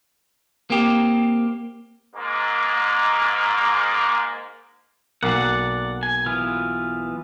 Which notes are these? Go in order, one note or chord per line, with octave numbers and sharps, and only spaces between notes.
A#3 C4 G4
G#2 A#3
B1 A#3 D5 F#5
G#5
E3 B3 F4